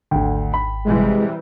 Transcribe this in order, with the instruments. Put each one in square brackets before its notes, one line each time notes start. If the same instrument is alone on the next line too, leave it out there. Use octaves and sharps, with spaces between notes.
[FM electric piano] G#1 G5 [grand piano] D2 D3
[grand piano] B5
[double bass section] C3 E3 G3 [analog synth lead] G#3